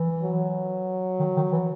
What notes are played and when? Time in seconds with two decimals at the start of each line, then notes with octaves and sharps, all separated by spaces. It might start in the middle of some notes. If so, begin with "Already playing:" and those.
Already playing: E3
0.23 F#3
1.19 D#3
1.36 D#3
1.52 E3